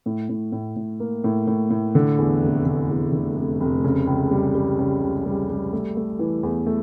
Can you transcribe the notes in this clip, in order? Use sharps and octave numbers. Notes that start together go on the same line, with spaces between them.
A2
A2
A2
A2
A#3
A2
A2
A2
D3
E2
F1
D3
E2
D3
F1
F1
C#3
C#2
G3
G3
C#3
C#2
G3
G3
A3
A3
E3
E2
A3